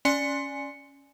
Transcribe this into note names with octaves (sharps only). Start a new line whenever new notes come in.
C#4 D5 G#5 C6 C#7